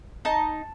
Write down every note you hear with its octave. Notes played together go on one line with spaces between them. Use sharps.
D#4 A5